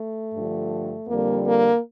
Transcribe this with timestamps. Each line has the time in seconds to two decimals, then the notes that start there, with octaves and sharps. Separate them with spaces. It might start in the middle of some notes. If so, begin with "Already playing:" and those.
Already playing: A3
0.34 G2 D3 F3
1.08 F2 D3 G3 A#3
1.46 A#3